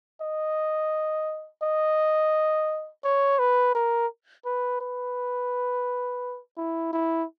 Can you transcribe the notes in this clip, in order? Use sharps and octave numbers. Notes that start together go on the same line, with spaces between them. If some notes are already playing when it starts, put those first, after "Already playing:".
D#5
D#5
C#5
B4
A#4
B4
B4
E4
E4